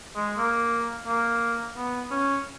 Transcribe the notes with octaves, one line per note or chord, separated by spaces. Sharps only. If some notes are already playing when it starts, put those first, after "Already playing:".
G#3
A#3
A#3
B3
C#4